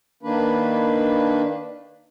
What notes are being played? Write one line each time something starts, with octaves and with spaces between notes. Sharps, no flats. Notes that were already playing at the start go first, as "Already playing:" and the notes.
D#3 A#3 D4 B4